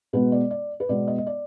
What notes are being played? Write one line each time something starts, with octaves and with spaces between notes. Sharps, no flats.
B2 G#3 B3 B4
D5
D5
B4
B2 G#3 B3 D5
D#5
D#5
D5